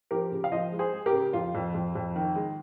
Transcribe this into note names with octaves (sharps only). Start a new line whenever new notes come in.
F3 G4 A#4
C#3
F5
F3 C5 D#5
G#3
G#4 C5
G#3
G4 A#4
C#3
F2 F4
F2
F2
F2
D#3
G#3